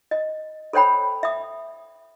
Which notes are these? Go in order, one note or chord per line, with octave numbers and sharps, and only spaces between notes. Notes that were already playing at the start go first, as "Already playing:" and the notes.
D#5
A4 C5 C#5 G5 B5
E5 D#6